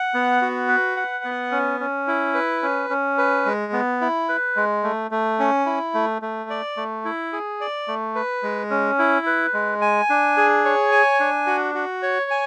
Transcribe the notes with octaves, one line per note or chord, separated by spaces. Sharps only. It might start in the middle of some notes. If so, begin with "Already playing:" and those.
Already playing: F#5
B3
F#4
B4
F#5
B3
C#4
C#4
E4
B4
C#4
C#4
B4
G#3
B3
E4
B4
G#3
A3
A3
C#4
E4
A3
A3
D5
A3
E4
G#4
D5
A3
B4
G#3
C#4
E4
B4
G#3
G#5
D4
G#4
C#5
G#5
D4
F#4
F#4
C#5
G#5